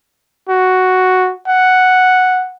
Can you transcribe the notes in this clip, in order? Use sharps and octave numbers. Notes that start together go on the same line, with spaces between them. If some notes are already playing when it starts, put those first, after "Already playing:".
F#4
F#5